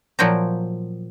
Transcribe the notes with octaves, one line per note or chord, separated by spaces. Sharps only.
A#2 F3 F#3 C5 G5 A#5